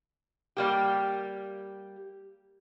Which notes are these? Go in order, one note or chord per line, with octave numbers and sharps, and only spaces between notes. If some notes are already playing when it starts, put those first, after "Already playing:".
G3 A#3 G4